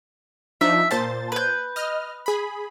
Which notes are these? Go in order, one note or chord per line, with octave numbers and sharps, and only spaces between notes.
F3 D4 D#4 E5
A#2 C5 A5 A6
B4 G6
D#5 F6
G#4 B5